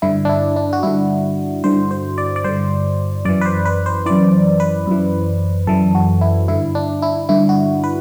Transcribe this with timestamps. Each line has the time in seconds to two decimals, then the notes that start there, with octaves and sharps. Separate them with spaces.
0.02 G2 D3 E4
0.25 D4
0.29 E4
0.56 D4
0.73 F#4
0.83 G2 D3 E4
1.64 G2 D3 C5
1.91 C5
2.18 D5
2.36 D5
2.44 G2 D3 C5
3.25 F#2 E3 D5
3.41 B4
3.46 C5
3.66 B4
3.86 C5
4.06 F#2 E3 D5
4.60 B4
4.87 F#2 E3
5.67 F#2 E3 A4
5.95 F#4
6.21 E4
6.48 G2 D3 E4
6.75 D4
7.02 E4
7.29 G2 D3 E4
7.49 F#4
7.84 B4